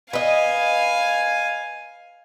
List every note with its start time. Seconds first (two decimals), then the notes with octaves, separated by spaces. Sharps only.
0.13 B4 D#5 F5 G#5